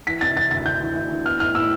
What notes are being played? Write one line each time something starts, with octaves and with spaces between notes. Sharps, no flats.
E3 B6
C3 A6
E3 A6
D2 A6
D2 G6
E3
D2
E3
B3 F6
A2 F6
A2 E6